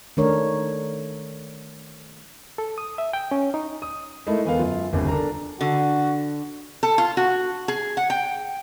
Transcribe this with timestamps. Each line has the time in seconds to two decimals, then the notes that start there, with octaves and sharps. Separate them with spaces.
0.17 D#3 A3 D4 A#4 C#5
2.58 A4
2.78 D#6
2.98 E5
3.13 G5
3.31 C#4
3.54 D#4
3.82 D#6
4.27 G#3 A3 D#4 E4 A#4
4.45 E2 B3 A4 A#4 F5
4.59 F#2 F4
4.93 G1 D#2 C#3
5.08 D4 A4 A#4 A#5
5.61 D3 F#4
6.83 A4
6.98 F4
7.17 F#4
7.68 G#4
7.97 F#5
8.10 G5